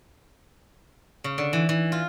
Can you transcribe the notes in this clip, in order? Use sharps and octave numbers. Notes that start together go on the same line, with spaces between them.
C#3
D3
E3
E3
F4